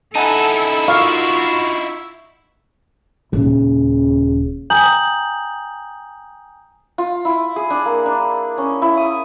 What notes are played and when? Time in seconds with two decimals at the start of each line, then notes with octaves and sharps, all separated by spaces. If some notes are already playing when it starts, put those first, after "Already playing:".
0.16 D#4 E4 A4 F#5 G#5 A5
0.88 F4 F#4 F5 C#6 E6
3.33 D#1 C#3
4.70 G5 G#5 A#5 D#6 G6 F#7
6.98 F4
7.25 E4
7.56 G#4
7.70 D4
7.86 A#3
8.06 D4
8.58 C#4
8.82 E4
8.97 D#6